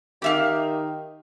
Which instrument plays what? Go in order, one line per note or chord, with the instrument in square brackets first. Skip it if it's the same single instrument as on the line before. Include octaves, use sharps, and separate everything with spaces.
[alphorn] D#3 [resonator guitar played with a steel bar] G4 E5 F5